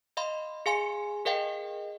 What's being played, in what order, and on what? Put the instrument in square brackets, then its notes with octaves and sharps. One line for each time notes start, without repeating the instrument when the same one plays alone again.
[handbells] D#5 F5 B5 C6
G#4 F5 G#5 C6 C#7
G#4 A#4 D#5 F5 G5